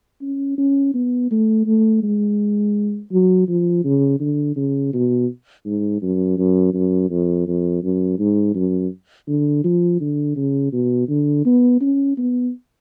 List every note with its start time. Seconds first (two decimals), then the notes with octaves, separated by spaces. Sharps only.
0.22 C#4
0.58 C#4
0.94 B3
1.31 A3
1.67 A3
2.03 G#3
3.12 F#3
3.48 F3
3.84 C#3
4.20 D3
4.56 C#3
4.93 B2
5.65 G#2
6.02 F#2
6.38 F#2
6.74 F#2
7.10 F2
7.47 F2
7.83 F#2
8.19 G#2
8.55 F#2
9.28 D3
9.64 F3
10.00 D3
10.36 C#3
10.73 B2
11.09 D3
11.45 B3
11.81 C#4
12.18 B3